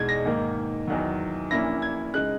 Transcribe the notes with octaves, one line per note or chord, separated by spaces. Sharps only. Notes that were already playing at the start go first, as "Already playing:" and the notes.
Already playing: E2 B2 G#3 D#4 G#6
A#6
G#2 D#3 A#3
E2 D#3 F#3
A#1 A#2 A#3 C#4 E4 A#6
G#6
C#3 G#3 D#4 F#6